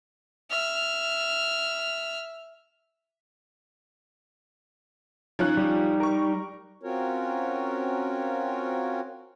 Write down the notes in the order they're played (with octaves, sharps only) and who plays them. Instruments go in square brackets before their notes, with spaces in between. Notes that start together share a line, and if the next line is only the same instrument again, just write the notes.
[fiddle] E5 F6
[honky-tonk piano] F3 C#4 F#6 [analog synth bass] D#4
[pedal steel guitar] G3
[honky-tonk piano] A#4 C#6
[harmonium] C4 C#4 F4 F#4 A#4 C#5